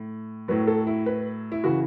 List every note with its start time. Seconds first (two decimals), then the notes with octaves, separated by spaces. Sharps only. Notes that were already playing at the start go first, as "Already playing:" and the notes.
Already playing: A2
0.48 A2 F#3 B4
0.67 A4
0.87 E4
1.06 B4
1.52 E4
1.64 C#3 E3 F#4